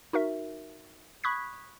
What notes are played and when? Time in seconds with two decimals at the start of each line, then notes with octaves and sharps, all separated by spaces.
0.13 D#4 F#4 A#4 E5
1.24 B5 C#6 D#6 F#6 G#6 B6